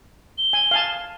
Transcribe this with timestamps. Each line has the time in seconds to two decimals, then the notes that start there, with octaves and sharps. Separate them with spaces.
0.38 G7
0.53 G#5
0.71 F5 G#5 A5